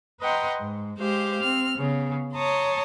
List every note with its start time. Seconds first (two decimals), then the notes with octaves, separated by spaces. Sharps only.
0.20 B4 D#5 F#5 G5 A#5 C6
0.59 G#2
0.99 G#3 G4 C5 F5
1.42 C4 F6
1.77 C#3 B3
2.35 C#5 A5 A#5 C6 D#6